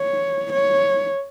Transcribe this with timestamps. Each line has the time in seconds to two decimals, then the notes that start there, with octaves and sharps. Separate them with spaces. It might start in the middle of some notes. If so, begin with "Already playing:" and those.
Already playing: C#5
0.53 C#5